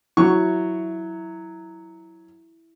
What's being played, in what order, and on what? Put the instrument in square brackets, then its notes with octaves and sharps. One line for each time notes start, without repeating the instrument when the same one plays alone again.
[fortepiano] F#3 C#6 [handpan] E4